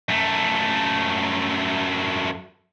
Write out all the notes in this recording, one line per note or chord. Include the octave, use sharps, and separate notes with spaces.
F#2 A3